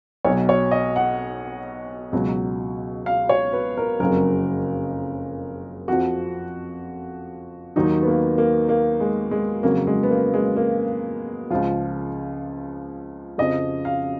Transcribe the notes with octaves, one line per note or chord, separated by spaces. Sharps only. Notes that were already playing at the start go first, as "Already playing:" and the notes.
B1 B2 F#3 C#5
C#5
D#5
F#5
C#2 B2 F#3
F5
C#5
B4
A#4
F#1 F2 C#3 F#3 A#4
F2 F3 F#4
D#2 D#3 F#3 D#4
B3
A#3
A#3
A#3
G#3
G#3
F2 C#3 F#3 A#3
G#3
B3
A#3
G#3
A#3
C#2 C#3 F3 F4
F2 C#3 F3 D#5
F5